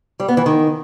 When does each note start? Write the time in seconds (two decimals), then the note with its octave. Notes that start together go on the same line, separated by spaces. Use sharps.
0.20 G3
0.28 B3
0.37 E3
0.46 D#3